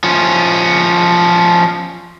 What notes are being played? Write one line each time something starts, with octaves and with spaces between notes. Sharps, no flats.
F3 C#4